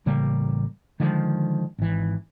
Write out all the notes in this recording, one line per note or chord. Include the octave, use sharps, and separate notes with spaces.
A1 C#3 G3 A#3
D3 D#3 F3 G#3
G#1 E3